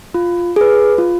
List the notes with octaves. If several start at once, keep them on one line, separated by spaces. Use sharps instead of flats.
F4
G#4 B4
F4